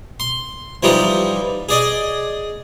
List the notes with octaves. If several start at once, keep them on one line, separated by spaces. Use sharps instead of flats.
C6
E3 F3 G3 D#4 G4
G#4 D5 D#5